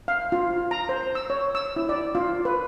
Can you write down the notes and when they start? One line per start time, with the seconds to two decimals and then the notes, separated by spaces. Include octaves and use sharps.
0.08 F5
0.32 F4
0.71 A#5
0.89 C5
1.15 E6
1.30 C#5
1.55 E6
1.76 E4
1.89 D5
2.15 F4
2.45 B4